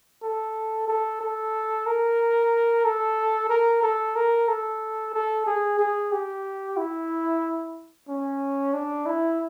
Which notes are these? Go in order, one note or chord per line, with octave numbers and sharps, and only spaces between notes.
A4
A4
A4
A#4
A4
A#4
A4
A#4
A4
A4
G#4
G#4
G4
E4
C#4
D4
E4